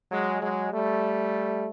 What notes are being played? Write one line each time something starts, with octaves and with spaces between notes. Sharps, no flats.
F#3 G#3
F#3 G#3
G3 A3